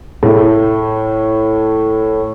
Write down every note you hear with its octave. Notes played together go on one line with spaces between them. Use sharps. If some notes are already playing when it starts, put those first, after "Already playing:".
A2 A3